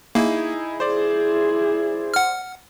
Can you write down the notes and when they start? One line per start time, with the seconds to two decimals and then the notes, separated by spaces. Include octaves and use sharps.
0.15 A#3 D#4 E4 G#4
0.80 E4 G#4 C5 D5
2.14 F#5 F6